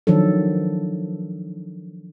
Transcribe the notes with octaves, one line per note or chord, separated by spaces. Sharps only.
D#3 F3 F#3 D4 A4